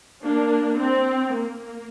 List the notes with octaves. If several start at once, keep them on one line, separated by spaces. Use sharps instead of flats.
A#3 D4
C4
A#3